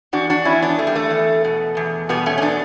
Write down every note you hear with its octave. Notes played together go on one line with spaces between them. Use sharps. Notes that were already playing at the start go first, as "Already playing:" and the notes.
E2 D4 F#4
D4 F#4
E2 C#4 E4
B3 D4
E2 A3
G3
A3
E2
B2
E2
B2 G3 B3
A3 C#4
C#4
B2 B3 D4